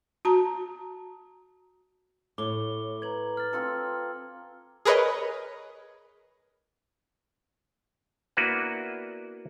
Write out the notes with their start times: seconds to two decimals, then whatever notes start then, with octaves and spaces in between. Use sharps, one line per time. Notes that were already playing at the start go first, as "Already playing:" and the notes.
0.25 F#4 A5 A#5
2.38 A2 C#5 D6 G7
3.02 B4 A#5 G#6 F#7
3.37 F6 A6
3.53 C4 F4 A4
4.85 G#4 A#4 B4 C#5 D#5
8.37 A#3 B3 D4 E4 F#4 B4